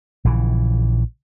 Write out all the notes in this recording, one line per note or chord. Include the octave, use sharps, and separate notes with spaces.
A#1 C#3 E3